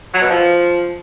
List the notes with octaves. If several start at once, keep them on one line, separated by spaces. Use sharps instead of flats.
F#3
B2
F3